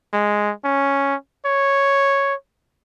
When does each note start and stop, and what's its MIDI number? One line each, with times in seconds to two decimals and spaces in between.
0.13 0.52 56
0.64 1.15 61
1.46 2.34 73